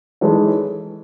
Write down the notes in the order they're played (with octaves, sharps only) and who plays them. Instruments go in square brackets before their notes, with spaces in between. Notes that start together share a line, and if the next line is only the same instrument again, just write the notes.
[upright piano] E3 G#3 D#4 A4 C#5